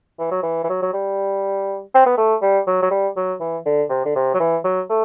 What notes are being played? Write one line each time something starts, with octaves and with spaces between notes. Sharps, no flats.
E3
F#3
E3
E3
F#3
F#3
G3
C4
B3
A3
G3
F#3
F#3
G3
F#3
E3
D3
C3
D3
C3
F#3
E3
F#3
A3